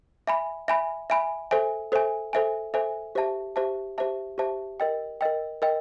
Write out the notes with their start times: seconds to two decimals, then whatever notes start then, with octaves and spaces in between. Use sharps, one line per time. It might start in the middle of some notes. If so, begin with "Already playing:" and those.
0.27 E5 G#5 B5
0.68 E5 G#5 B5
1.10 E5 G#5 B5
1.51 A4 C5 E5 G#5
1.92 A4 C5 E5 G#5
2.33 A4 C5 E5 G#5
2.74 A4 C5 E5 G#5
3.15 G4 C5 E5 A5
3.56 G4 C5 E5 A5
3.98 G4 C5 E5 A5
4.38 G4 C5 E5 A5
4.80 A#4 D#5 G5
5.21 A#4 D#5 G5
5.62 A#4 D#5 G5